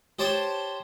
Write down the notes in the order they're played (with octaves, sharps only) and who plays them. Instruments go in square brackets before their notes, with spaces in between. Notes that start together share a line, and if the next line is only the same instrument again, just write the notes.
[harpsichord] G4 C5 C#5 A5 C6 D6